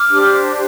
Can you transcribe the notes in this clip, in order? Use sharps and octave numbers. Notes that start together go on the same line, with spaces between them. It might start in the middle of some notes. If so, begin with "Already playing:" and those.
Already playing: D6 F6
D4 G4 C5